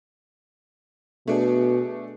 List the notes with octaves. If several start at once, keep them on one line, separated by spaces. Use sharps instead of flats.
B2 A3 D4 G#4